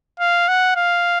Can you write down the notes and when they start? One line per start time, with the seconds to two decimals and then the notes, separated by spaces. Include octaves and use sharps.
0.20 F5
0.48 F#5
0.76 F5